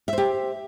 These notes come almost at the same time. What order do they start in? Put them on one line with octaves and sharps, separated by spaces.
E5 C5 G4